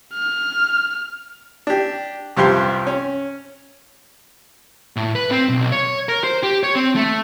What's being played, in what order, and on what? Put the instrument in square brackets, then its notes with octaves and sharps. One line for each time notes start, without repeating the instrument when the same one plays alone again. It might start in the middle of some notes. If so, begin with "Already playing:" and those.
[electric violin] F6
[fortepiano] D4 G4
C2 G2 F3 G4 C6
C#4
[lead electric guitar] A2
B4
C4
B1
C#5
A#4
C5
G4
C#5
C4
A3